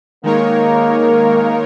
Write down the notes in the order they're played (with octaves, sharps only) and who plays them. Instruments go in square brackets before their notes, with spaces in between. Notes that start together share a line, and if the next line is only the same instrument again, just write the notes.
[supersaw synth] D#3 G#3 D#4 A#4 C#5 [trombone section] A#3